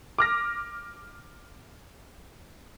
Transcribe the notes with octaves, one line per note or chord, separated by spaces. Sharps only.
D6 F6 A#6